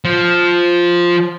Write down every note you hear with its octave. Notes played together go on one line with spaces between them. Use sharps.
F3